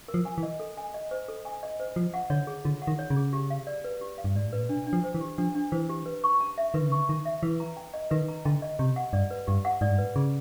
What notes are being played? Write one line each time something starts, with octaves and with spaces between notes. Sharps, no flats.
A#4
F3
G#5
E3
D#5
A4
G#5
D#5
C5
A4
G#5
D#5
C5
F3 F4
F#5
D3 C#5
G#4
D3 F4
F#5
D#3
C#5
C#3
G#4
G4
F5
D5
B4
G4
F5
G2
G#2 D5
A2
A#2 B4
B2 D4
D4
F3
C5
E3
G4
F3 D4
D4
E3 C5
G4
B4
C#6
A5
E5
D#3 B4
D3
C#3
D3 C#6
D#3 A5
E5
E3 B4
A#5
G5
D#5
D#3 B4
A#5
D3 G5
D#5
C3 G4
F#5
G2 D5
B4
G2 G4
F#5
G#2 D5
G2
G#2 B4
C#3 G#4